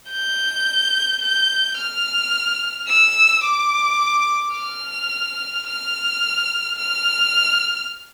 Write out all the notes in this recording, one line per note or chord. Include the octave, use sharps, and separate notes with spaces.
G6
G6
F6
E6
D6
F6
F6
F6